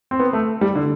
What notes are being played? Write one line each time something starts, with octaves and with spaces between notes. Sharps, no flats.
C4
B3
A3
G3
D3